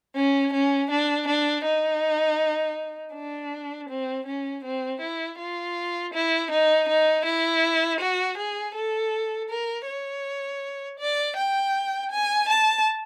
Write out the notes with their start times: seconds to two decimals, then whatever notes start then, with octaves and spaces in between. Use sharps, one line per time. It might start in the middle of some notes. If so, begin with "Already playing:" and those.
0.16 C#4
0.53 C#4
0.91 D4
1.28 D4
1.66 D#4
3.14 D4
3.89 C4
4.26 C#4
4.64 C4
5.01 E4
5.39 F4
6.13 E4
6.51 D#4
6.89 D#4
7.25 E4
8.00 F#4
8.37 G#4
8.75 A4
9.49 A#4
9.87 C#5
10.99 D5
11.37 G5
12.11 G#5
12.49 A5